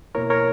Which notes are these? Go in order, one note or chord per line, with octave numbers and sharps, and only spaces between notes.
B2 A#3 E4 A#4 C#5
A#4 C#5